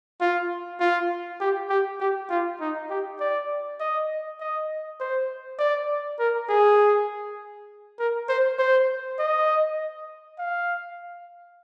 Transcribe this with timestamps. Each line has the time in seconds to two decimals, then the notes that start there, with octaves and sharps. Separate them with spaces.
0.21 F4
0.80 F4
1.41 G4
1.70 G4
2.00 G4
2.30 F4
2.60 D#4
2.90 G4
3.20 D5
3.80 D#5
4.40 D#5
5.00 C5
5.59 D5
6.19 A#4
6.49 G#4
7.99 A#4
8.29 C5
8.59 C5
9.19 D#5
10.39 F5